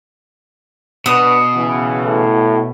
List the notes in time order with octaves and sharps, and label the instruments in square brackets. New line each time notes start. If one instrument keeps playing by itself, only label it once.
[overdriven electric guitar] B2 [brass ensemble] D4 F#4 B4 [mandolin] D#6
[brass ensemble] C#3 E3
[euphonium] A2